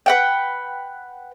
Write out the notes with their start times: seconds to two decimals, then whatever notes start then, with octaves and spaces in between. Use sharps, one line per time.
0.06 B4 F#5 G5